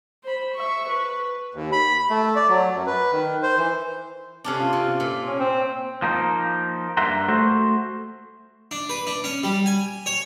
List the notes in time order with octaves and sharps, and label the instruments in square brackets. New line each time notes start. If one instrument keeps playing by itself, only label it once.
[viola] C5 B5
E5 C#6
B4
[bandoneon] D#2
B5
A3
D5
F#3
F#2
B4
D#3
C5
E3
[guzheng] C3 C#4 D4
[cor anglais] F4
[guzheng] C3
A#2
[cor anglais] C#4
C4
[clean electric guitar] F3 A#3 D#4
G2 A#3 E5 F#5 A#5 C6
A3 F#4 C5
[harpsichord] D4
B4
D4
C#4
G3
G#5
C#5